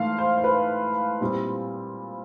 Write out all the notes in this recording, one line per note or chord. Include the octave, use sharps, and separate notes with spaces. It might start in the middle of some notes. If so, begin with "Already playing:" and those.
Already playing: G#2 E3 A3 F5
C5
C5
B4
A#2 G3 C4 E4